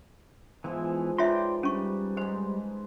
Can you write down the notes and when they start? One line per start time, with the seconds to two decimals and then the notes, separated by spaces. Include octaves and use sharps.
0.64 G#2 E3 F3 B3 E4 G#4
1.18 F4 B4 C#5 D5 E5 G5 A#5 C6
1.63 G3 C#4 C#6
2.17 G#2 G#3 C5